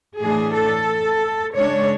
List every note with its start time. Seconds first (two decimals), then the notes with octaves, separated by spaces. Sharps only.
0.20 A2 E3 A3 D4 G#4
0.54 A4
1.54 C#3 G#3 D4 C#5